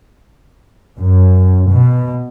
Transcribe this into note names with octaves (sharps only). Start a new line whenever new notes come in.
F#2
B2